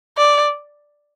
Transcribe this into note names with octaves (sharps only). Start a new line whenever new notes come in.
D5